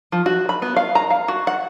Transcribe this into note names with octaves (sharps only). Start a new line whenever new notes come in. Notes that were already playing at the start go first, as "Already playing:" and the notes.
F3
F#4
B5
B3
F5
A#5
F5
F#4
F#5